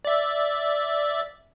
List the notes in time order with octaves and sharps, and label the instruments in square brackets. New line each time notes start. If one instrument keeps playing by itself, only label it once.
[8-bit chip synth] D5 E5